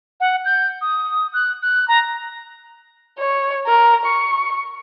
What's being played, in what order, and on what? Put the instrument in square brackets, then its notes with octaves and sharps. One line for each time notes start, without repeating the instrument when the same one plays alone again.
[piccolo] F#5
G6
D#6
F#6
F#6
A#5
[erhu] C#5
A#4
C#6